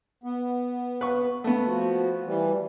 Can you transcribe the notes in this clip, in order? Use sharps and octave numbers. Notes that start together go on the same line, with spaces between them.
B3
B4 C#6
A3 B3
F3 F#4
E3 G3